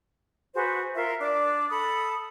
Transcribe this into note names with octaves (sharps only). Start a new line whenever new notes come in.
F#4 G#4 B4 C5
F4 A#4 E5
D4 D5 D6
A4 B5 D#6